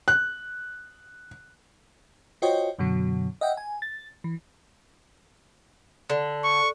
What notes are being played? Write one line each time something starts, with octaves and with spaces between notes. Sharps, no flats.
F#6
F4 F#4 C5 C#5 D#5 G5
F#2 B2 D3 F#3
D#5 E5 F#5 G5
G#5
A6
E3
D3
C#6